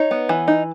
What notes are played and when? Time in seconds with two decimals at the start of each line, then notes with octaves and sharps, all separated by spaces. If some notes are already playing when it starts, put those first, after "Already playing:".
Already playing: D#4 C#5
0.11 B3
0.29 E3
0.48 D#4